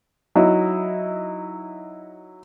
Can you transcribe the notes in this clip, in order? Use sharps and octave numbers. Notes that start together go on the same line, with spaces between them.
F#3 D#4 E4